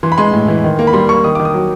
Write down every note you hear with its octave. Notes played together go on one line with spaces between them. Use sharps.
E3 C6
B5
G#3 C6
A2
E3
D#3
A#3
B5
G3 C6
A#3 C#6
D#3 D#6
D#3 D6
D#6
F#3